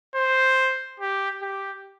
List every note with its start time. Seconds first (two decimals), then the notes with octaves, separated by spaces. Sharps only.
0.15 C5
1.00 G4
1.42 G4